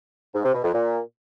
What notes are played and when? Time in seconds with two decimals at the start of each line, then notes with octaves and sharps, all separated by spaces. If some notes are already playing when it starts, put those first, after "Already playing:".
0.34 G#2
0.44 C3
0.54 B2
0.64 F2
0.74 A#2